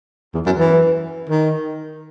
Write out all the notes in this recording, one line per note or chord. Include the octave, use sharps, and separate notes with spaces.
E2
F#2
E3
D#3